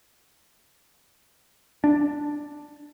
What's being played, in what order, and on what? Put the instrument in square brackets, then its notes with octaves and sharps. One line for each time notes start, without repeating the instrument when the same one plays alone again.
[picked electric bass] D4